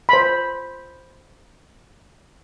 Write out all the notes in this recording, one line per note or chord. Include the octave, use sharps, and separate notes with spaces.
C5 B5